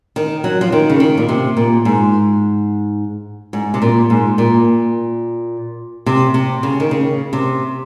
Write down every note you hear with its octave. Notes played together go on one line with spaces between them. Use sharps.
D#3
F#3
F3
D#3
C#3
D#3
A#2
C3
A#2
G#2
G#2
C3
A#2
G#2
A#2
C3
C3
C#3
D#3
C#3
C3